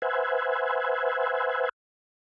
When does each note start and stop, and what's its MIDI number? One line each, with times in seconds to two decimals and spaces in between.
0.02 1.69 71
0.02 1.69 72
0.02 1.69 76
0.02 1.69 78
0.02 1.69 80